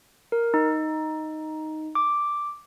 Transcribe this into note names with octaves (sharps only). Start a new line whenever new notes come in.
A#4
D#4
D6